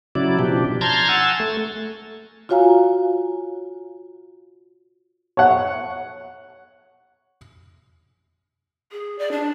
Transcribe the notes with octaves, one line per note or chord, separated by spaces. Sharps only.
C#3 F#3 E4 D5
B2 F3 D4 G4
A5 A#5 C6 F6 G6 G#6
F#5 G#5 E6 A6
A3
F4 F#4 C#5 F5 G#5 A#5
C#5 F#5
G#4
D5
D4